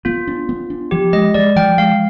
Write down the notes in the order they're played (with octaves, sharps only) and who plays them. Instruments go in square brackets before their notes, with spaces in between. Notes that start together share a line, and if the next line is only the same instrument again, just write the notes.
[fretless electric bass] B3 [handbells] F4
[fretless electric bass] D4
B3
D4
[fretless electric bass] F3 [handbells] G4
[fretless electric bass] G#3 [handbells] D#5
[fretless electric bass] G#3 [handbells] D5
[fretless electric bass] F3 [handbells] G5
[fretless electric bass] G#3 [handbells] F5